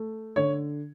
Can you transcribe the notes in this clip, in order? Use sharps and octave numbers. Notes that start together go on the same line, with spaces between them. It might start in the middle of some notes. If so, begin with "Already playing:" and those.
Already playing: A3
D3 C#5